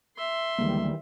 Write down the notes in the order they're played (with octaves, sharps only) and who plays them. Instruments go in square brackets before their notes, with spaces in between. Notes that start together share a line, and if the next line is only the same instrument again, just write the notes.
[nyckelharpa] E5 C6
[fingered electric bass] D2 G#3 A#3 [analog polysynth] D#3 E3 G3